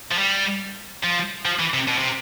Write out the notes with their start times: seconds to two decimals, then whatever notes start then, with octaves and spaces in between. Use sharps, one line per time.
0.11 F3
0.18 G3
1.03 F3
1.45 F3
1.59 E3
1.74 C3
1.88 B2
1.98 C3